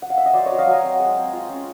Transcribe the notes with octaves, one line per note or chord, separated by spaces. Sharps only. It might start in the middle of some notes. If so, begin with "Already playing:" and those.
F#5
F5
E5
D#5
F#3 C5 D5
F#3 C#5 D#5
D#5 F5
F#3 G#5 A#5
C4
G#3
C4
F4
C#4